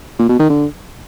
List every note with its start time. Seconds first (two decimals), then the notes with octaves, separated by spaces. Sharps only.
0.19 A#2
0.29 B2
0.39 D#3
0.50 D3